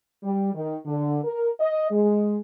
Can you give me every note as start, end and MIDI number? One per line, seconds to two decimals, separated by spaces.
0.23 0.50 55
0.54 0.77 51
0.86 1.19 50
1.24 1.49 70
1.60 1.91 75
1.91 2.37 56